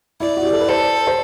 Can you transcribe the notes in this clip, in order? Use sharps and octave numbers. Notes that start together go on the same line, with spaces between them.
E4 D5
F#4
G4
A4
B4
A4 C5
C5